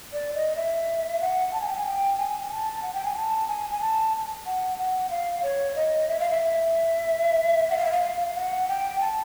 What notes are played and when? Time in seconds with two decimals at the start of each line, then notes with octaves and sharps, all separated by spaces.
0.13 D5
0.34 D#5
0.56 E5
1.21 F#5
1.53 A5
1.61 G#5
1.69 G5
1.77 G#5
1.86 G5
2.18 G#5
2.51 A5
2.82 F#5
2.94 G5
3.05 G#5
3.16 A5
3.48 G#5
3.70 G#5
3.81 A5
4.46 F#5
4.78 F#5
5.10 F5
5.43 C#5
5.76 D#5
6.08 E5
6.20 F5
6.30 E5
7.70 F#5
7.77 F5
7.85 E5
7.92 F5
8.02 F5
8.30 F5
8.35 F#5
8.68 G5
9.00 A5